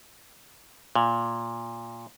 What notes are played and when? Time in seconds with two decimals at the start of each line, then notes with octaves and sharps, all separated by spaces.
0.95 A#2